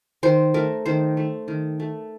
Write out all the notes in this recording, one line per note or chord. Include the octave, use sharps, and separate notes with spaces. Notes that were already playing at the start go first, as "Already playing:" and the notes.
D#3 C5
A3 A#4
D#3 C5
A3
D#3
A3